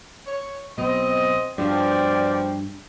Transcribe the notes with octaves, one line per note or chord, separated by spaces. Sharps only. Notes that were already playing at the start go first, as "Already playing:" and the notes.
C#5
B1 B2 C4 D#5
G2 B2 F3 D5 G5